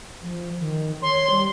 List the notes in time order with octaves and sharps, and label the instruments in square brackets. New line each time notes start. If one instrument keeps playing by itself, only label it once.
[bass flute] F3
D#3
[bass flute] C#5 [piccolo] C6
[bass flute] G3